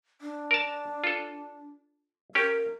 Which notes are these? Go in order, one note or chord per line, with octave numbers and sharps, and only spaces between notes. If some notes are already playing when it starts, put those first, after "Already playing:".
D4
A#4 A5
F4 A4
C#4 G4 A#4